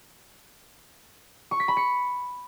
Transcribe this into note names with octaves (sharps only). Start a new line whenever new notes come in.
C#6
B6
B5
C#7